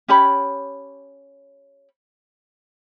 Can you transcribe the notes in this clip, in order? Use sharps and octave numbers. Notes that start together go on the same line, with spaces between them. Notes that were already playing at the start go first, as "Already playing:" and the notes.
C#4 G4 C#5 B5